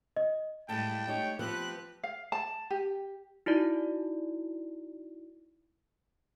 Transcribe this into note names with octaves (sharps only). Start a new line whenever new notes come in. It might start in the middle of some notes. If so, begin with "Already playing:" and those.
D#5
A2 G3 G#3 E4 G5 A5
A3 D#4 G4 C#5
F3 B3 C4 G4 B4 C5 F#6
F5
A5
G4
D#4 E4 F#4 D5